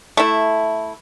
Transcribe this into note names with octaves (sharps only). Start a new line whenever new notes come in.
A3 E4